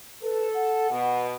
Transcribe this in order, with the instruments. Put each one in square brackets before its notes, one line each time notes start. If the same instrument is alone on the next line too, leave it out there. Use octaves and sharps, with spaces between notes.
[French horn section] A4 [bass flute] B4
[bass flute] F#5
[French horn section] B2